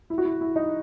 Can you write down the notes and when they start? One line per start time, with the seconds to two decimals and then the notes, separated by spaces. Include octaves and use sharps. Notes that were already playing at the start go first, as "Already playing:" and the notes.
0.10 E4
0.18 F#4
0.25 E4
0.41 E4
0.56 D#4